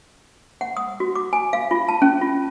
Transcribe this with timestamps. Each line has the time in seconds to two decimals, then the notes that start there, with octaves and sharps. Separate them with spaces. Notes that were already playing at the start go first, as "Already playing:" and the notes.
0.61 F#5
0.77 D#6
1.00 F#4
1.15 D6
1.33 G#5
1.53 F5
1.71 F4
1.88 A5
2.02 C#4
2.21 F4